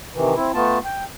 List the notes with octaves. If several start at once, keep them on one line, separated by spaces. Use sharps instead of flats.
C3 D#3 E3
C4 E4
A3 B3 F4 A5
G5